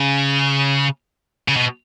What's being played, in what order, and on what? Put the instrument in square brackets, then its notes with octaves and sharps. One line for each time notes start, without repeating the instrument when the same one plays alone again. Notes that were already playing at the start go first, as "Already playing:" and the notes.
Already playing: [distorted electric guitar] C#3
C#3
B2